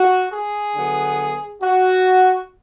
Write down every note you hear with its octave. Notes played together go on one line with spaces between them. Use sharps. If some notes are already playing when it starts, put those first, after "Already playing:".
Already playing: F#4
G#4
D3 F#3 B3
F#4